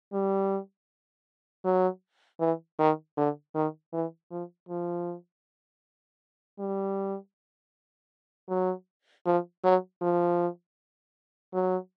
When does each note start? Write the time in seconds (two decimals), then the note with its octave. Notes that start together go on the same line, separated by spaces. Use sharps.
0.13 G3
1.65 F#3
2.40 E3
2.79 D#3
3.17 D3
3.55 D#3
3.93 E3
4.31 F3
4.69 F3
6.59 G3
8.49 F#3
9.26 F3
9.64 F#3
10.02 F3
11.54 F#3